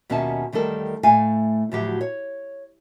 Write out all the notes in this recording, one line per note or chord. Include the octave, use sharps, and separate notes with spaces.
D#2 B2 C#4 F4 E5 A5
E2 D#3 G3 A3 A4 A#4
A2 A3 F5 G#5
D2 A2 F3 F#3 G4 E5
C#5